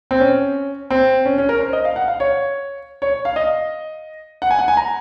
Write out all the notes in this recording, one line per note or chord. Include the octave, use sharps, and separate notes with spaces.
C4
C#4
C4
C#4
C#4
A#4
C5
D#5
F5
F#5
F5
C#5
C#5
F5
D#5
F#5
G#5
F#5
G#5
A#5